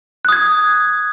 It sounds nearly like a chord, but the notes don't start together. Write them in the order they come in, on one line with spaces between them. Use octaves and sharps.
F#6 D#6 G#6